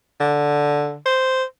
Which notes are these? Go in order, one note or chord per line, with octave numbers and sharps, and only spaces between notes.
D3
C5